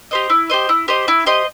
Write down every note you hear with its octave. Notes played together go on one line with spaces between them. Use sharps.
G4 C5 D#5
E4
G4 C5 D#5
E4
G4 C5 D#5
E4
G4 C5 D#5